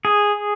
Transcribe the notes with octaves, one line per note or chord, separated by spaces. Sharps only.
G#4